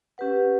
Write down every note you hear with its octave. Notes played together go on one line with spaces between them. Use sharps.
C#4 G4 B4 F#5